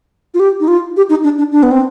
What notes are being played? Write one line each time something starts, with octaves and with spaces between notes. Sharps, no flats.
F4
G4
D#4
F4
G4
D#4
D4
D4
D4
B3
C4